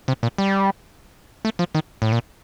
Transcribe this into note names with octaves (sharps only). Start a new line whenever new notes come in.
C3
A#2
G3
A3
F3
D#3
A2
A#2